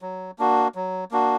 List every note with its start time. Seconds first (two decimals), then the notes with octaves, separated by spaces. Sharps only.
0.02 F#3
0.39 A#3 D4 F#4
0.75 F#3
1.11 A#3 D4 F#4